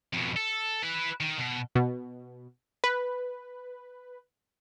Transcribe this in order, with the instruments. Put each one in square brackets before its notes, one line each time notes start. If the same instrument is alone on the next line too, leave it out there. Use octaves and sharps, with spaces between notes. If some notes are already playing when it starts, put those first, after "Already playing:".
[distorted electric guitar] F2 B2
A4
E4 B4
D#3
B2
[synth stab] B2
B4